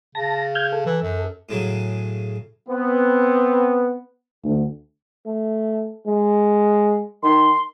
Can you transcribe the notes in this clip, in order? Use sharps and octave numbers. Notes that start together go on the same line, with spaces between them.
C#3 A5 A#6
F6 G6 G#6
A4
E3
F#2
A2 C#3 F#3
B3 C4
D2
A3
G#3
D#3 C6